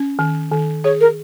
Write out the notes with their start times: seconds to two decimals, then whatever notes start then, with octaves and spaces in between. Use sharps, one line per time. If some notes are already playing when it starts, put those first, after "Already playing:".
Already playing: C#4
0.19 D#3
0.52 D#3
0.84 G#4 C#5
1.01 A#4